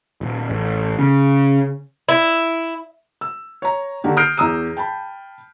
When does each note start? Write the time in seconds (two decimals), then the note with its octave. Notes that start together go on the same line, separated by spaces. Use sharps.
0.21 D#1
0.50 A1
0.99 C#3
2.09 E4
3.21 E6
3.62 C#5 A#5
4.04 D3 D#3 A#3 G4
4.17 D#6 F6 G6 C7 D7
4.37 E2 A#5 D#6 E6 D#7
4.77 G5 A5 B5